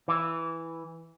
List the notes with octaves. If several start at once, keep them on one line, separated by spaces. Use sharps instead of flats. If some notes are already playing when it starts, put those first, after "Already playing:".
E3